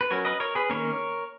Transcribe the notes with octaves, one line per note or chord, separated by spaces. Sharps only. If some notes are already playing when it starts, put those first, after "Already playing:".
B4
F#3 C#4 A#4 C#5
B4 D#5
A#4 C#5
G#4 B4
D#3 A#3 C#4 A#4 C#5